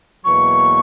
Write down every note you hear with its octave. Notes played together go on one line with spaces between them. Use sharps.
E2 B2 F#3 A#3 C#6